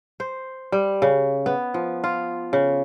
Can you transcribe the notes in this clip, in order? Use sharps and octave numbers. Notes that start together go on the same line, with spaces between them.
C5
G3
C#3
B3
F3
F4
C#3